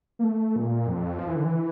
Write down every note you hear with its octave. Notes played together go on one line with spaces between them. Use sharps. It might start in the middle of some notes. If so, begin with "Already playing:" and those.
A#3
A3
A#2
F2
F3
E3
D3
E3